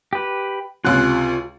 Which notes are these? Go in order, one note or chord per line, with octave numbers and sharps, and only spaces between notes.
G4 B4
C#2 C3 C#4 F4 F#6